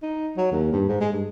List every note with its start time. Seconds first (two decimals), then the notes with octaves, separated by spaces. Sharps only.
0.02 D#4
0.37 F#3
0.51 D#2
0.72 G2
0.88 G#2
1.00 G#3
1.12 G2